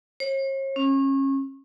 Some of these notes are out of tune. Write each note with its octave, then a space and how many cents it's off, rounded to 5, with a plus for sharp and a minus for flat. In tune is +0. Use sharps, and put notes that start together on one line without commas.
C#5 -45
C#4 -30